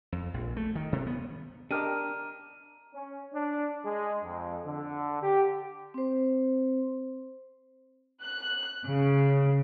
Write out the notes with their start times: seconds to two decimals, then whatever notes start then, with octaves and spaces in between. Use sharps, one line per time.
0.12 F2
0.34 A#1
0.57 A3
0.75 D#3
0.93 C3
1.07 B3
1.71 D4 G4 A#4 D#5 A#5 F6 D#7
2.94 C#4
3.33 D4
3.84 G#3
4.23 F2
4.65 D3
5.22 G4
5.94 C4 C5
8.23 F#6
8.84 C#3